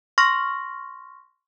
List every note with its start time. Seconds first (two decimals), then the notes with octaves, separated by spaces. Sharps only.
0.18 C6 C#6 F6 A#6